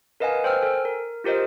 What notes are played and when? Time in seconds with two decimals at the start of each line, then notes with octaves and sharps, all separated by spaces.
0.20 A#4 B4 D#5 F5 F#5 G#5
0.43 A#4 C5 G5 E6 F6
0.61 A4 G#5
0.85 A#4
1.24 F4 G4 A#4 C5 D#5